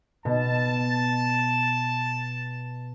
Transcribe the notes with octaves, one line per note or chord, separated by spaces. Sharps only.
B2 A5